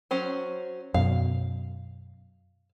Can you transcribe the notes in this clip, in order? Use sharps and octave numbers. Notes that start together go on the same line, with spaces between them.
F#3 C#4 C5
F#2 B2 F5